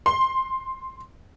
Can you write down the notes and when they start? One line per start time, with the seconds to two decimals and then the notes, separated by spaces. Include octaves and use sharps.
0.06 C6